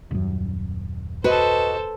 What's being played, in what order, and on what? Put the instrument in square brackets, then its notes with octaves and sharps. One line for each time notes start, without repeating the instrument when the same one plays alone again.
[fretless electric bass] D#1 F#2
[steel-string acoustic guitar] F#4 D#5 [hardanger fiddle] A4 C5 [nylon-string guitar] B4